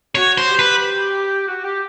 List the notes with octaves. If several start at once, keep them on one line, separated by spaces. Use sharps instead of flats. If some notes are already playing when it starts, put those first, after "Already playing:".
F#4 C#5
C5
G4
B4
F#4
G4